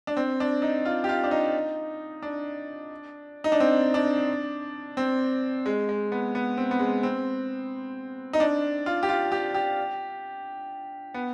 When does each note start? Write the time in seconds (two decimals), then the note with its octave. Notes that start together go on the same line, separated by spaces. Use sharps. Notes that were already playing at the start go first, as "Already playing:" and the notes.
0.07 D4
0.17 C4
0.40 D4
0.62 D#4
0.85 F4
1.04 G4
1.09 F4
1.24 D4
1.31 D#4
2.23 D4
3.44 D#4
3.52 D4
3.60 C4
3.94 D4
4.97 C4
5.66 G#3
5.89 G#3
6.12 B3
6.35 B3
6.57 C4
6.71 B3
6.80 G#3
7.03 C4
8.33 D#4
8.40 D4
8.86 F4
9.03 G4
9.09 F4
9.32 G4
9.54 G4
11.14 B3